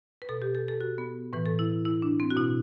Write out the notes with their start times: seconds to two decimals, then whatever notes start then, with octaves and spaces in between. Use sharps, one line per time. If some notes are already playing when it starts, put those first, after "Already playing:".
0.22 B4
0.29 B2 A4
0.42 G4
0.55 A4
0.68 A4
0.81 F#4
0.98 B3
1.33 A2 E3 B4
1.46 A4
1.59 E4
1.85 E4
2.02 D4
2.20 C4
2.30 F#4
2.37 B2 E4